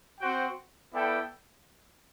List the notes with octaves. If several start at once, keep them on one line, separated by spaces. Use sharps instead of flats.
C4 F#4 C5 G5
B3 E4 A4 D5 G5